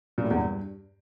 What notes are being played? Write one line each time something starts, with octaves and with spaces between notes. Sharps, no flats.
A#2
A2
E2
G2